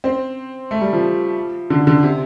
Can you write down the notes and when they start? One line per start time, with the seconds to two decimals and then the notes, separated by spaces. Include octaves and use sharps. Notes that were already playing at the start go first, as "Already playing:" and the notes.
0.04 C4
0.71 A3
0.81 G3
0.93 F3
1.70 D3
1.87 D3
2.03 C3